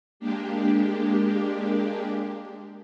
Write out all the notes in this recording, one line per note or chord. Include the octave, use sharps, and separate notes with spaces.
G#3 A#3 D4 G4